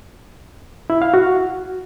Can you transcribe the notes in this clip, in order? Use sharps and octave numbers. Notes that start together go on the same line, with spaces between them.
E4
F5
F#4